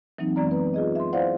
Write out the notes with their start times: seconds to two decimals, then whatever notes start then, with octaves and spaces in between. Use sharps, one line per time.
0.18 E3 F#3 A#3 C4 D#4
0.36 F#2 E3 G#3 B3 D5 A#5
0.51 B4
0.74 F4 G#4 D#5
0.95 E5 C6
1.13 E4 C5 D5 F5 F#5